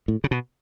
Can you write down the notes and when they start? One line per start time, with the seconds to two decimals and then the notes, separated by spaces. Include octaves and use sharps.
0.08 A2
0.24 C#3
0.31 B2